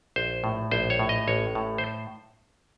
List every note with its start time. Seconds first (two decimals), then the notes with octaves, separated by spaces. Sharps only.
0.16 A#1 C5
0.44 A2
0.71 A#1 C5
0.90 C#5
0.99 A2
1.09 D#5
1.28 A1 C#5
1.55 A2
1.78 C5